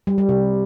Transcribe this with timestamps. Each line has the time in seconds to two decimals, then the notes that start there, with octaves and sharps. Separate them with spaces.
0.07 G3
0.18 G3
0.29 C3